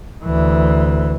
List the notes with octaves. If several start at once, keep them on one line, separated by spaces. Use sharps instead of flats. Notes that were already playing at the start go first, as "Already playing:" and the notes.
D2 E3